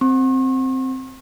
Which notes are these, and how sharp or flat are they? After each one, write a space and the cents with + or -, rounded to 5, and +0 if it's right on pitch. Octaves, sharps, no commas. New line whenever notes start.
C4 +0 C#6 -45